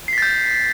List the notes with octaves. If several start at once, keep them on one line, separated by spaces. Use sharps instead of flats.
G6 A6 B6 C7